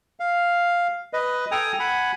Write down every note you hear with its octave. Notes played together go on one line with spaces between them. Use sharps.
F5
B4 D#5
A4 G5 G#5 A#5 D#6
F#5 G#5 B5